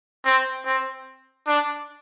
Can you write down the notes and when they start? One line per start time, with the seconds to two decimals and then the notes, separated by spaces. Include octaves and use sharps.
0.25 C4
0.65 C4
1.47 D4